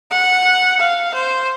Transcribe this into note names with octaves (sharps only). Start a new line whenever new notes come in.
F#5
F5
C5